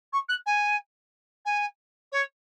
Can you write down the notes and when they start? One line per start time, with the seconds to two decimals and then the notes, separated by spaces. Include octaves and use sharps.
0.13 C#6
0.29 F#6
0.46 G#5
1.45 G#5
2.12 C#5